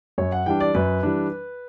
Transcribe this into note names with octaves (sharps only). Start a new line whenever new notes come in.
F#2 C#5
F#5
E3 G3 D4 G5
D5
F#2 B4
E3 G3 D4